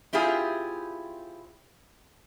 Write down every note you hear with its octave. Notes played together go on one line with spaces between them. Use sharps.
C4 E4 F4 G4 G#4